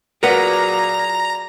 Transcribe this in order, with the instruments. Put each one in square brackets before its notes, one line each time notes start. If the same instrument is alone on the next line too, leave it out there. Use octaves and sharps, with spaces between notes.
[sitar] A#2 [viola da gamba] F#3 F#4 G#4 [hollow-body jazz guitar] A#4 B4 F#5 [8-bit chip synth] A#5